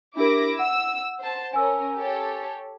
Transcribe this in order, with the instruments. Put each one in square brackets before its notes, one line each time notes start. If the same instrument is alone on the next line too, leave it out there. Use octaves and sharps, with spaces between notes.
[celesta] D4 G4 A#4 [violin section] E4 D6 A#6
[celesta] F#5 [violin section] E6
[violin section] C5 A5
[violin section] C#4 A#4 [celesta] G#5 E6
[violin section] G4 A4 C#5